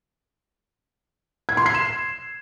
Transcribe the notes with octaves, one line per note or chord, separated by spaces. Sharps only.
G#6
C6
C7
E7